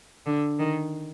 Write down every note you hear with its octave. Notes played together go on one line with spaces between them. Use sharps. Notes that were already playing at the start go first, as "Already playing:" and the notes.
D3
D#3